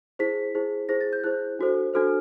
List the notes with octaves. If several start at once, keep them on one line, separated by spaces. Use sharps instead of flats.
E4 G#4 C5 B6
E4 G#4 C5
E4 G#4 C5 A#6
A6
G6
E4 G#4 C5 F#6
D4 F#4 A4 C5
D4 F#4 A4 C5 F6